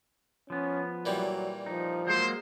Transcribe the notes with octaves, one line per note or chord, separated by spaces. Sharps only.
F3 B3 C#4
A#2 E3 F#3 G3
F3 D#4
F#3 G#3 A#3 C5